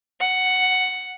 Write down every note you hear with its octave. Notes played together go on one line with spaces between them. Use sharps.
F#5